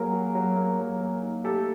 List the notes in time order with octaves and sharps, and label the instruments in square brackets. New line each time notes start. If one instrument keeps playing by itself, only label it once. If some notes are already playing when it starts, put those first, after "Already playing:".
Already playing: [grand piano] F#3 A#3 [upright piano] G#4 A#4
[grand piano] F#4
F#3
A#3
F#3
A#3
D#4
[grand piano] A3 [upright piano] G4 A4